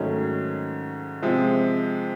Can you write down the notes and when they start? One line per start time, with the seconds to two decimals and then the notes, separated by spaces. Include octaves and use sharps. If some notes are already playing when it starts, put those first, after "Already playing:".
Already playing: G#2 D#3 F#3 A3 C#4
1.22 C3 F3 G#3